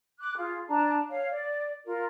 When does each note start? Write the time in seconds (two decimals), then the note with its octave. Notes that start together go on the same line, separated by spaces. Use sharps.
0.20 D6 F#6
0.36 F4 G#4
0.67 D4 A5 A#5
1.09 C#5 F5
1.30 D5
1.85 F4 A#4